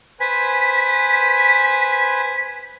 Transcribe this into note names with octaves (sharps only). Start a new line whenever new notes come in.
B4 C5 G#5 B6